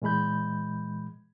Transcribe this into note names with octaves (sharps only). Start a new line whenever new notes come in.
A#2 E3 G#3 B5 G6